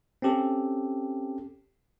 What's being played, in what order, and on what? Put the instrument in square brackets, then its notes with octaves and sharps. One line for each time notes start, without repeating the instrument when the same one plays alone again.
[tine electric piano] C4 C#4 G4 A4